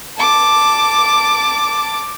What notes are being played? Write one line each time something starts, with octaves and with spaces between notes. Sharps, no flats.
A5 D6